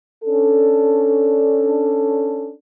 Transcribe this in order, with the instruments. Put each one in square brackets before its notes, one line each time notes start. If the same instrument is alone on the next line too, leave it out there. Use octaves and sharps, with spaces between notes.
[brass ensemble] C#4 D4 A4